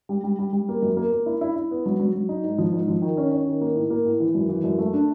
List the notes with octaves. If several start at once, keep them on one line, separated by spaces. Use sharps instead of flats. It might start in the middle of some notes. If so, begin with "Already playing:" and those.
G3
G3
G3
G3
A#3
F#2
A#3
A#3
E4
E4
E4
B3
F#3
F#3
F#3
D#4
G#2
F3
G#2
F3
D#3
C#4
C#4
D#3
A#3
A2
A#3
A2
E3
F#2
E3
F#2
A3
D4